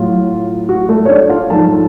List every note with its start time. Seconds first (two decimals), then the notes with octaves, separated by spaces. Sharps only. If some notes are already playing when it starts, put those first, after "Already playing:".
Already playing: A2 F#3 F4
0.69 F#4
0.89 A3 A4
1.05 C#5
1.09 D4 D5
1.29 F4 F5
1.50 G#2 F3 A4 A5